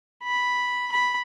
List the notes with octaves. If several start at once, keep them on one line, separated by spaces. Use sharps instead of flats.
B5
B5